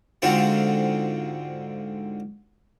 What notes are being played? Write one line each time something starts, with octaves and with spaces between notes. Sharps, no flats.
G#2 D3 C4 F4 F#4